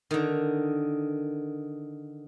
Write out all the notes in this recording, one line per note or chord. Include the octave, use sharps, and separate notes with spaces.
D3 D#3